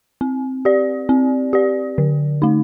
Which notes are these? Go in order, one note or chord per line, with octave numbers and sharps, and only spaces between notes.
C4
G4 D5
C4
G4 D5
D3
A3 D#4